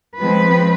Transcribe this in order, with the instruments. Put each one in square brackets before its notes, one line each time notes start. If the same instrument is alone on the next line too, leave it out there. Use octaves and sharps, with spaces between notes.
[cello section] F3 G#3 C4 B4